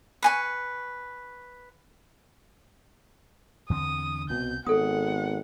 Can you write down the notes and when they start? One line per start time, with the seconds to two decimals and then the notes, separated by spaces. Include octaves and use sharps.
0.22 B4 G#5 C#6
3.70 E2 D3 C4 D#6
4.30 C2 B2 C4 G6
4.67 G#1 B3 A4 F#5 D#6